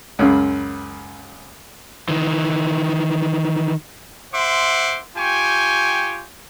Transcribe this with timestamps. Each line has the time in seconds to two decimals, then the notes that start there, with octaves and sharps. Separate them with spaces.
0.19 C#2 F#2 C#3
2.09 D#3 E3
4.34 C5 E5 F#5 C6 D6
5.16 F4 G4 G5 G#5 C#6